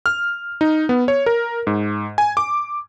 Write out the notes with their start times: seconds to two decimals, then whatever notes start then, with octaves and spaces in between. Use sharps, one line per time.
0.06 F6
0.61 D#4
0.89 B3
1.08 C#5
1.26 A#4
1.67 G#2
2.18 G#5
2.37 D6